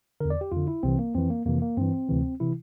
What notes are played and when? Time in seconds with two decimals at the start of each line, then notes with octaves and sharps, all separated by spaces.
0.21 E2 D3 A#4
0.30 D5
0.41 G4
0.52 F2 D3 F4
0.68 E4
0.83 C2 C3 E3 C4
0.99 A#3
1.15 F2 E3 C4
1.30 A#3
1.46 F2 C3 E3 A#3
1.62 A#3
1.77 G2 E3 C4
2.09 D2 C3 E3
2.40 C3 E3 E4